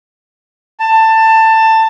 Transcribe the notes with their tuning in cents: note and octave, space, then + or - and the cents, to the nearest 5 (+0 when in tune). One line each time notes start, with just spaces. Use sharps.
A5 +15